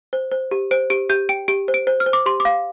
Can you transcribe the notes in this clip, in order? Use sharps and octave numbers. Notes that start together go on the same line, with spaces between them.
C5
C5
G4
C5 D7
G4 D7
G4 G6
G5 D7
G4 D7
C5
D7
C5
F6
C5
D6
G4 C6
D6
F5